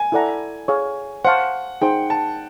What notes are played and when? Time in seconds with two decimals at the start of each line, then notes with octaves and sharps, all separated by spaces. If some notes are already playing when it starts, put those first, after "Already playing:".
Already playing: G#5
0.12 E4 A4 D5 F#5 A#5
0.68 G#4 C#5 F5
1.24 C5 F5 F#5 A5 C#6
1.82 D#4 G#4 C5 G5
2.10 A5